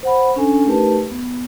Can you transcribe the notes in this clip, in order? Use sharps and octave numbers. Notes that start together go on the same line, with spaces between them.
C5 F#5 B5
C#4 D4 A4 G#5
A3 D#4 G4 A#4 B4 A5
B3